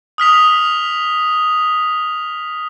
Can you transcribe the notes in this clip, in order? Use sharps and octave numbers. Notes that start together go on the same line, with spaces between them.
D#6 F6 B6 F7